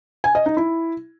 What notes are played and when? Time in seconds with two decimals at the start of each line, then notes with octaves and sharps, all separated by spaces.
0.24 G#5
0.35 D#5
0.46 D#4
0.57 E4